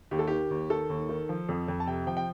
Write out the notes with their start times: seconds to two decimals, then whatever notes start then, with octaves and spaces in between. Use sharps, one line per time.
0.11 D#2 G4
0.19 A4
0.27 D#3 G4
0.50 D#2
0.70 D#3 A4
0.90 D#2
1.09 D#3
1.29 F3
1.49 F2
1.68 F2
1.80 A5
1.87 C3 G5
2.07 F3 G5
2.17 G5